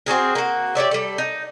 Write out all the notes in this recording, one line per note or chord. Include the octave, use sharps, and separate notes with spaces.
C4 F#4 G#4 A#4
A#3 F#4
G4 C#5 D5 E5
G3 A4
D#4